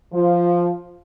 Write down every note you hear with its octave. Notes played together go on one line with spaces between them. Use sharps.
F3